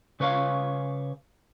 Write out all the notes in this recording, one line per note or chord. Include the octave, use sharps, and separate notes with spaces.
C#3 B4 C#5 E5 F5